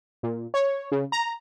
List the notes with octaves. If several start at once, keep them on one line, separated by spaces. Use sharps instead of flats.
A#2
C#5
C#3
A#5